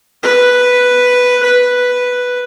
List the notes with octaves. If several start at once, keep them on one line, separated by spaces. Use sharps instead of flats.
B4
B4